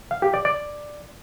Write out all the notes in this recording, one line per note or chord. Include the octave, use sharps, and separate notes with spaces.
F5
G4
D5
D5